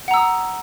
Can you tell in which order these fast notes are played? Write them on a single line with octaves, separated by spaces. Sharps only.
F#5 A#5 E6 D#6